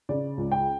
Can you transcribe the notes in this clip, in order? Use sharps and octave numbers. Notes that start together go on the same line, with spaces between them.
C#3 D5
C#2
G5